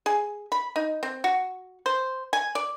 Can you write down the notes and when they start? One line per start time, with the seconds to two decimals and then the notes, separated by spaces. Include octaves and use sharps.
0.06 G#4
0.52 B5
0.76 D#4
1.03 C4
1.24 F#4
1.86 C5
2.33 G#5
2.55 D5